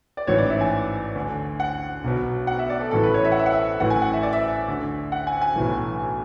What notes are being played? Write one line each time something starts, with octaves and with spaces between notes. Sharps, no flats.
D5
A1 G#2 E3 C#5
D5
E5
G#5
D2 D3
F#5
B1 B2
F#5
E5
D5
A4
A1 A2 E3 A4
B4
C#5
E5
F#5
E5
F#5
E5
A1 A2 E3 F#5
G#5
F#5
E5
D5
E5
D2 D3
F#5
G#5
G#5
B1 A2 E3